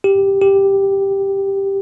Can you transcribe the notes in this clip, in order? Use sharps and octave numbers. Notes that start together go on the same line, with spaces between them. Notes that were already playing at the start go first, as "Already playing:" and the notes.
G4
G4